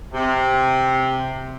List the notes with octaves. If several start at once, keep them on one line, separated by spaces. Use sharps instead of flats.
C3